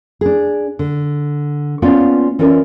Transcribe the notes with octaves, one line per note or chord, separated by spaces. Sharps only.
D4 G#4
D3
A#3 B3 C#4 F4 D5 F5
E3 C#4 F4 A#4 D5